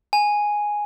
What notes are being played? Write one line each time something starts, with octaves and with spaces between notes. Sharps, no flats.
G#5